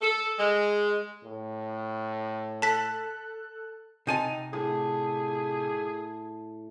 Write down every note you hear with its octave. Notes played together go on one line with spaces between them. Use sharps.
A4
G#3
A2
A4 A5 F#6 B6
C3 D#4 G#5 A5
A2 G#4